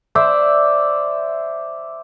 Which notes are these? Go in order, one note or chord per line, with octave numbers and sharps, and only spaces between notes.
C5 D5 E5